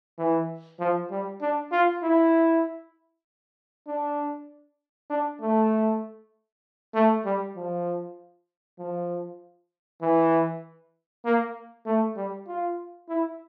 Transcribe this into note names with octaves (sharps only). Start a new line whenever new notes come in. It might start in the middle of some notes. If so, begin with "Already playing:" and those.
E3
F3
G3
D4
F4
E4
D4
D4
A3
A3
G3
F3
F3
E3
A#3
A3
G3
F4
E4